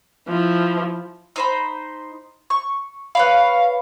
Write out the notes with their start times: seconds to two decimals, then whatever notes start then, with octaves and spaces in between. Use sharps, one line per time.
0.28 F3 E4
1.36 D#4 C5 B5
2.50 C#6
3.15 B4 C#5 F5 B5